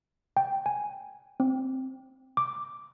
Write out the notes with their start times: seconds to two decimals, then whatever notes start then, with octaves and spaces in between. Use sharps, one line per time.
0.37 G5
0.66 G#5
1.40 C4
2.37 D6